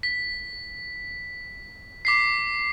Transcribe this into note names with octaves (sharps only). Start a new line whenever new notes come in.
B6
D6 B6 C7